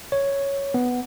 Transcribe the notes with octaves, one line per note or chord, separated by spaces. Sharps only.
C#5
B3